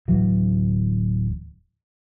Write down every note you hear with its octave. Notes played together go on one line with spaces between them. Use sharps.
D1 E3 F#3